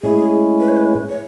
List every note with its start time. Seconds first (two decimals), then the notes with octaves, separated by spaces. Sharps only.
0.02 A2 G#3 C#4 E4 G#4
0.60 B4
0.69 C#5
0.77 B4
1.09 C#5